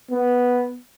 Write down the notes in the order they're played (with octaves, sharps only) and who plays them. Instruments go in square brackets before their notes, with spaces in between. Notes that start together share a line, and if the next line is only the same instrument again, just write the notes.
[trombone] B3